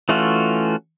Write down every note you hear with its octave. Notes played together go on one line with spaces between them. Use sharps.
E3 A3 C#4 F4 F#4